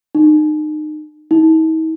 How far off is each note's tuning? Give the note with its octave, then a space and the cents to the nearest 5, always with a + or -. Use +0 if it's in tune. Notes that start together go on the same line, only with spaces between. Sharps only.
D#4 -30
D#4 +45